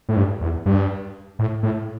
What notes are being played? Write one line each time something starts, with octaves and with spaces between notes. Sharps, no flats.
A2
G2
E2
G2
A2
A2